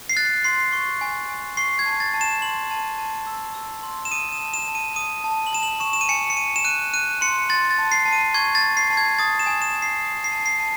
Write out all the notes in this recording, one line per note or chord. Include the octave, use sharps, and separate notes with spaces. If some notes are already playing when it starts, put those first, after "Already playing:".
C7
F#6 A6
C6 C7
C#6
G#5
G#5
C#6 C7
G#6
A5
A6
A5
E7
C6 F#7
A5
A5
E6
E6
C6
E7
D#6 D#7
E7
A5
E7
A5
D#7
D#6 D#7
A5
F#7
A5 E7
F#7
C#6 E7
E7
D#7
G#5 C#7
C#7
G#5 D#7
E7
F#6 D#7
F#6 D#7
C6 C#7
C6 A6
A6
A5
C7
A5
D#7
C#6 G#6
A6
A5
C7
A5
G#6
D#6 A6
E7
G#5
E7
G#5
C7
D#6
C7
A5
C7
A5